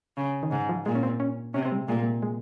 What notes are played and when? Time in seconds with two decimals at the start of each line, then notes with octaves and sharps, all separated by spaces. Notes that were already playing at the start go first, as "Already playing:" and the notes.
0.17 C#3
0.43 D#3
0.51 G#2 C#3
0.69 F3
0.86 A#2 G#3
0.95 C#4
1.03 C4
1.20 C#4
1.54 C3 C#4
1.65 C4
1.72 G3
1.78 G#3
1.89 A#2 G#3
1.95 A#3
2.02 G#3
2.22 G#3